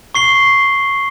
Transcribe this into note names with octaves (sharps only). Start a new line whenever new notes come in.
C#6 C7 G7